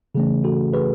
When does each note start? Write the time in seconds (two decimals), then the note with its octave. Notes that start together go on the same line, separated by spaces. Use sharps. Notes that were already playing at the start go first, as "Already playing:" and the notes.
0.15 C#3 E3 A3 C#4 G#4
0.44 F#4 A4
0.73 G#4 B4